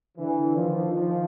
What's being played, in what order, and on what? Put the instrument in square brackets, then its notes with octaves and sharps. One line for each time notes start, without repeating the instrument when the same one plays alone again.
[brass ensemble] D3 E3
D#3 F3
D#3 F3